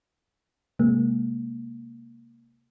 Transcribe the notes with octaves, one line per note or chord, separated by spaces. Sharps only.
C3 G#3 A#3